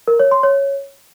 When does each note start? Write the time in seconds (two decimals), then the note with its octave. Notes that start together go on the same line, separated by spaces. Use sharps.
0.08 A#4
0.19 C#5
0.31 C6
0.43 C#5